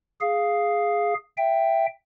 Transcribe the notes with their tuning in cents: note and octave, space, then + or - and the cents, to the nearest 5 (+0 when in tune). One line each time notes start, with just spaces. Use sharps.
G#4 +0 F5 +0
E5 +10 G5 +0